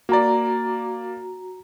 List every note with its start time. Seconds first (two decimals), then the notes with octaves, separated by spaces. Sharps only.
0.09 A#3 F#4 D5 A#5